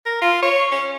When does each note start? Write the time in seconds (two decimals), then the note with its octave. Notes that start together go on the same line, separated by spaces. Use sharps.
0.06 A#4
0.22 F4
0.43 C#5
0.72 C#4